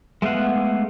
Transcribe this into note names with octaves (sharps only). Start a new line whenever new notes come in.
G#3 A3 B3 F5 F#5